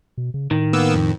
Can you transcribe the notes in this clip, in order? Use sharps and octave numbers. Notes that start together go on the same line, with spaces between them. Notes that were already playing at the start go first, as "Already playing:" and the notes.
B2
C#3
A2 D#3
A#3 B3 E6
F2